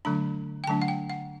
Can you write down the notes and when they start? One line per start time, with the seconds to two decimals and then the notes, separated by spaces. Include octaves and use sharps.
0.05 D3 F#3 A3 D4 B5
0.64 G5
0.67 D3 F#3 A3 D4 A5
0.82 F#5
0.88 G5
1.10 F#5